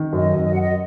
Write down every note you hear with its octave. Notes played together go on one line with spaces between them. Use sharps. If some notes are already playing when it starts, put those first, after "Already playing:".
Already playing: D#3
F#2 D#5
F#2
D#5
F#2 F#5
D#5